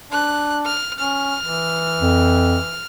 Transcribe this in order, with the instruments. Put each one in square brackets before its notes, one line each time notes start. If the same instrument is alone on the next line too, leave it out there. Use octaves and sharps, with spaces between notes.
[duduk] D4 [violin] F#6
[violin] F6
[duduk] C#4 [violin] F6
[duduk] E3
[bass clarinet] F2